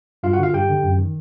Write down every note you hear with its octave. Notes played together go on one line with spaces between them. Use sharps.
G2 F4 F5
F#4 F#5
D3
F4 F5
G2 G4 G5
D3
F#2
D#3